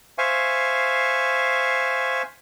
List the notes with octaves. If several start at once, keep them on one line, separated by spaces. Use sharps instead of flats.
C5 E5 F5 G#5 C#6